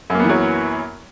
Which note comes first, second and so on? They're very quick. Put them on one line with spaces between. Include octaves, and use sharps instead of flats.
F#2 A#3 B3 E3 F#3